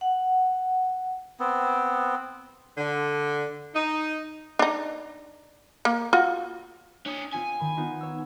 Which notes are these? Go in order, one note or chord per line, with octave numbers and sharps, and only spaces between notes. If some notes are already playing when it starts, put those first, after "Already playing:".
F#5
B3 C4
D3
D#4
D4 D#4
A#3
F4 F#4
D4 C#5 D#6 B6
C4 F4 G#5 B6
D#3 B5
B3 D#4 F4
C#5 E6